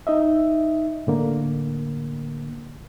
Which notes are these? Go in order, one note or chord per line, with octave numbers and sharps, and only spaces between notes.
D#4 D#5 E5
A2 D3 A#3